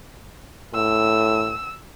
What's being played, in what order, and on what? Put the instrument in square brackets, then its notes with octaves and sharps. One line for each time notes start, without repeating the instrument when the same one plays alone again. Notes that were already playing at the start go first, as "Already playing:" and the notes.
[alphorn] A2 [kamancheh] E6